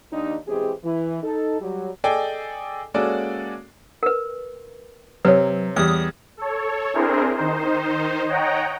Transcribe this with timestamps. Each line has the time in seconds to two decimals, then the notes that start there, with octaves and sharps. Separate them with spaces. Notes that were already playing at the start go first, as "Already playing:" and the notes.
0.12 D#2 D4 D#4
0.48 E3 G#3 C4 G4 G#4
0.84 E3
1.22 D#4 A4
1.61 F#3 G3
2.04 G#4 A4 D5 D#5 G5 G#5
2.94 G#3 A#3 C#4 F#4 A4 D5
4.03 A#4 B4
5.25 C3 F#3 B4 C#5
5.76 E2 G3 D#6
6.37 A4 C#5
6.94 C4 D4 E4 G#4 A#4 C5
7.36 D#3 D#4 C5
8.27 C#5 D#5 F#5 G5 A#5